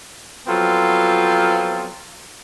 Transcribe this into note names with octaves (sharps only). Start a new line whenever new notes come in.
F3 F#3 B3 C4 F4 A4